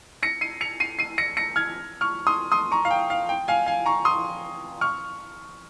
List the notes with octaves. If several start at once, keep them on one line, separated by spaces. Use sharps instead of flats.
A#6 C#7
C7 D#7
C#7 F7
C7 D#7
C7 D#7
A#6 C#7
A#6 C#7
F6 G#6
C#6 F6
C6 D#6
C6 D#6
A#5 C#6
F5
G5
F5
G5
F5 G#5
F5 G#5
A#5 C#6
C6 D#6
C#6 F6